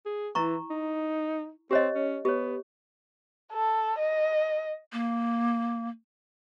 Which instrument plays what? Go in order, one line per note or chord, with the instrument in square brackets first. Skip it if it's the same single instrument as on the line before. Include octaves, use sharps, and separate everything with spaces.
[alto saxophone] G#4
[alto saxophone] E3 [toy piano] E4 A#5 C#6
[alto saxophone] D#4
[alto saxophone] C4 [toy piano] G4 C#5 D#5
[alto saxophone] C#4
[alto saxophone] B3 [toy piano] G4 C#5
[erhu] A4
D#5
[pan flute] A#3